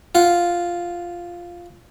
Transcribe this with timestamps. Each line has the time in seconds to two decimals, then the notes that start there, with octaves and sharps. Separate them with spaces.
0.15 F4 F#5